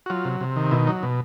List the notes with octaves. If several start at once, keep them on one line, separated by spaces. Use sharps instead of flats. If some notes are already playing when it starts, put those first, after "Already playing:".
F#4
F#3 F4
C3
C3
D#3
B2 E4
F#3 D#4
B2